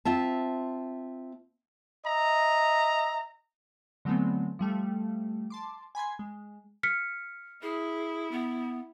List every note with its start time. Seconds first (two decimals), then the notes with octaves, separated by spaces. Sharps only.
0.05 C4 F4 E5 A5
2.06 D#5 E5 A#5
4.05 D3 F#3 G#3 A3 B3 C4
4.59 F3 G3 A3
5.50 A5 C6 D6
5.95 G#5 B5 C6 G#6
6.19 G#3
6.83 F6 B6 C#7
7.63 E4 G#4
8.31 B3